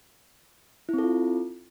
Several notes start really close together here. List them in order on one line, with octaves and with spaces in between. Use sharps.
E4 C4 A4 F4